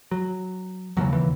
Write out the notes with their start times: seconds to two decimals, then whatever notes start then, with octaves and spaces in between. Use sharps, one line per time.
0.11 F#3
0.97 E1 D#2 C#3 F#3
1.13 E3